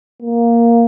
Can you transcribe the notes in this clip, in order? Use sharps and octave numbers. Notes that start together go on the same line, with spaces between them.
A#3